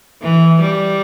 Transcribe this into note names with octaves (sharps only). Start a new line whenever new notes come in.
E3
G3